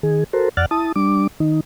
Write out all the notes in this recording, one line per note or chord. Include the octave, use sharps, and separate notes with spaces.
D#3 G#4
F#4 A4 A#4 C5
F2 D5 F#5 F6 F#6 A6
E4 A5 D#6
G3 D4 D6
D#3 D#4